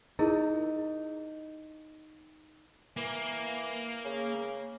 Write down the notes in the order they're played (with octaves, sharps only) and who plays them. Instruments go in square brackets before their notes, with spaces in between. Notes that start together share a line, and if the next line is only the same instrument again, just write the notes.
[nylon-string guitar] D#4 [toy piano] E4 G#4 A#4
[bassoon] E3 [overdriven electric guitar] A#3
[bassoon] C#3